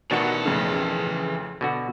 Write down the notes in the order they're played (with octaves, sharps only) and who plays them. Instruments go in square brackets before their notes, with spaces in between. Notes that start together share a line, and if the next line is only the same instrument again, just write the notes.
[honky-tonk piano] A1 F#4 C#7 [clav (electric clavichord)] B2 D#3 D4 [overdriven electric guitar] E3 A4
[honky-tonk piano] F2 A2 C#3
[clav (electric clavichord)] B2 D3 F#4